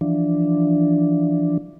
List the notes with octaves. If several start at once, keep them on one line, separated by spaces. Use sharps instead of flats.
E3 F3 D4